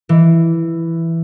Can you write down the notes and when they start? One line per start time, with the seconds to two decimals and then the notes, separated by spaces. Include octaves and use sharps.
0.09 E3